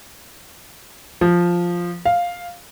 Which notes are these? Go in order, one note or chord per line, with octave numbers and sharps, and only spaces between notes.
F3
F5